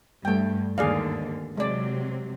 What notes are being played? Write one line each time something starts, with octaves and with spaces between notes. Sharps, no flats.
G2 A3 G5
D#2 G#2 D3 G#4 D5 F5
C3 F#3 G#3 D5